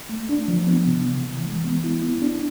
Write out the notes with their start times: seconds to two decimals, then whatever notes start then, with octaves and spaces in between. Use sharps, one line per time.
0.09 A3
0.29 D4
0.48 F3
0.67 B3
0.87 C3
1.06 E3
1.26 E3
1.45 G#3
1.65 B3
1.84 E4
2.03 B3
2.22 D4